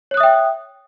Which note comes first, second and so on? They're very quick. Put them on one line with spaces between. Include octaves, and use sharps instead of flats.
C#5 F#6 D#6 E5 G5